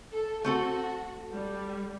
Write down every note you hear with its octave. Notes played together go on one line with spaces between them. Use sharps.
A4
A3 C4 F#4 A4
G3